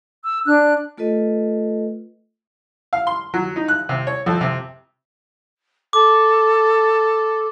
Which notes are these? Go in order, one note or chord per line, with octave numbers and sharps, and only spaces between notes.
E6
D4 F#6
A3 F4 A4 B4 D#5
F5
C6
F#3
D#4
F#6
C3
C#5
F2
C3
A4 D6